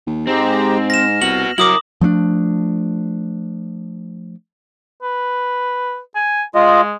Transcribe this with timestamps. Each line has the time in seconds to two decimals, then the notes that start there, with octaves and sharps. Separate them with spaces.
0.07 D#2
0.27 G#2 G#3 C4 G4 A#5
0.90 F6 A#6 E7
1.22 C2 B3 F#4 F#7
1.58 F#3 E4 A#4 D6 D#6 F#7
2.01 F3 A3 C4 D4
5.03 B4
6.16 G#5
6.55 G#3 F4 D#5